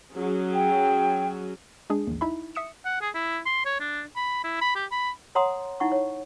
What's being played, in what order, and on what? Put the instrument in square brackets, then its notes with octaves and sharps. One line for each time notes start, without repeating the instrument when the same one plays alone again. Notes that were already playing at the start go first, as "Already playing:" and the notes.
[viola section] F#3 C#4 G#4
[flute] G5
[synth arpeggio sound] G#3 D4 G#4
A1 D#2
D#4 E4 E5 B5
E5 D#6 C#7 E7
[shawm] F#5
G#4
E4
C6
C#5
D4
B5
E4
B5
G4
B5
[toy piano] C#5 F#5 A#5 C6 D#6
D#4 E4 F#5 C#6
C#5